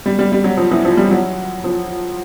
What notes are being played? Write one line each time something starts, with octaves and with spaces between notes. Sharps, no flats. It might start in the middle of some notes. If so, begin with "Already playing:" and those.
G3
G3
G3
F#3
F3
E3
F3
G3
F#3
F3